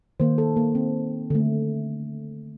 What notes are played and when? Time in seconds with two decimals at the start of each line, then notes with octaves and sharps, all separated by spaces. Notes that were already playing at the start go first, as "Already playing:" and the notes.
0.20 D#3 A#3 C5
0.38 A4
0.57 A#3
0.75 C4
1.30 D3 A3